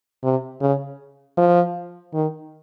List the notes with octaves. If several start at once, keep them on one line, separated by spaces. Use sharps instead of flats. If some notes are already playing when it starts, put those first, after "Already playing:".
C3
C#3
F3
D#3